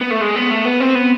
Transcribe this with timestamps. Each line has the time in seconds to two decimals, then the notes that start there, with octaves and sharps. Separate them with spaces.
0.01 B3
0.11 A3
0.21 G#3
0.36 B3
0.51 A3
0.66 B3
0.80 C4
0.95 B3